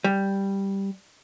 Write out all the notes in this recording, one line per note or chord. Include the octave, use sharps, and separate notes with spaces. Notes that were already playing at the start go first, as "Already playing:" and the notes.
G3